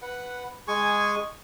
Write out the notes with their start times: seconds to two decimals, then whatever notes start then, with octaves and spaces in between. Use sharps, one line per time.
0.02 B4 F#5
0.68 G#3 G#4 G#5 C#6